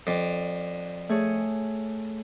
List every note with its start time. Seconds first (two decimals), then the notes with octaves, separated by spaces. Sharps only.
0.07 F2 D5
1.09 A3 G#4 C#5